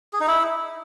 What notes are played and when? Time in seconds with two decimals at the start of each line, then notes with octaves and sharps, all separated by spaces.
0.13 G#4
0.20 D#4
0.28 E4